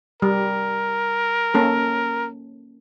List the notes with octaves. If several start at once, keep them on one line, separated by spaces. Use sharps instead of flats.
G3 A#4
A#3 C#4 A4